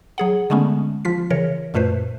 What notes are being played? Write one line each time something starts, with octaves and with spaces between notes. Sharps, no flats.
F#3 G#4 F#5
D3 G#3 A3 B3 C#4
F3 F4 B6
C#3 E3 A#4 C#5
F#2 A#2 A3 B4 C5